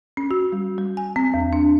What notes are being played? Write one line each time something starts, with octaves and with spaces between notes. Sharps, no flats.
C#4
F#4
G3
G3
G#5
C4
E2
D4